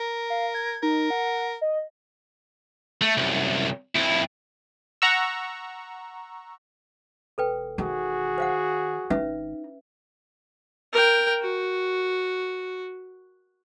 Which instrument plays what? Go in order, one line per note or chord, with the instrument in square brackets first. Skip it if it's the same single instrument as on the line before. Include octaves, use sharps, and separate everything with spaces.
[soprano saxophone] A#4
[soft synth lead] F5
G#6
[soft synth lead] D#4 [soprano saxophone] A#4
[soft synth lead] F#5
D#5
[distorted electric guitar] A3
C2 F#2
F2 E4
[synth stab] F#5 A#5 C#6 E6
[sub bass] E1 [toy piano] A4 B4 G5
[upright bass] D#3 [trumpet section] F#4 G#4
[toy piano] C5 F5 F#5
[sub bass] G#1 [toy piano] C#4 B4 E5 [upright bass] D#4
[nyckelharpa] A#4 G5
F#4